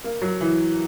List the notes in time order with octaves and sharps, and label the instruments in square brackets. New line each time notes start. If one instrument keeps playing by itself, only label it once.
[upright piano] A#3
F#3
E3